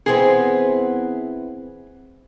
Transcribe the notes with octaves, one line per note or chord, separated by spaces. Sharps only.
E3 B3 C4 G#4